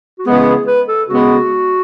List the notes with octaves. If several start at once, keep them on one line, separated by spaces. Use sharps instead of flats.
F#4
C#3 E3 G#3 B3 G#4
G#4
B4
A4
C#3 G#3 B3 F#4